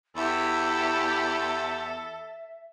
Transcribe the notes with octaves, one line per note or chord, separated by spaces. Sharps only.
E2 E4 G4 A4 E5